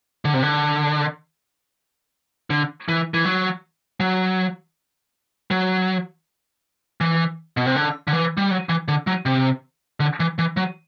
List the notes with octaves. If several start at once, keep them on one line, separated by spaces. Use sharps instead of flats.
D3
C3
D3
D3
E3
E3
F#3
F#3
F#3
E3
B2
C3
D3
D3
E3
G3
F#3
E3
D3
F#3
C3
D3
E3
E3
F#3